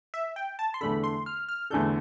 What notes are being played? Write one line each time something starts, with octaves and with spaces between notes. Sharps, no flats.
E5
G5
A5
C6
E2 D3 A3 D4 A4 B5
C6
F6
F6
E2 D3 A3 D4 A4 G6